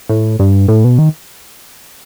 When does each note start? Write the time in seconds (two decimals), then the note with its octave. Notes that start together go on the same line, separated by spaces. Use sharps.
0.09 A2
0.39 G2
0.68 A2
0.84 B2
0.98 D#3